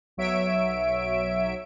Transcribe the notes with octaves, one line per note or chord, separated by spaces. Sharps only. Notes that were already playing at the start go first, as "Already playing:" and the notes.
B1 F#3 C#5 E5 D7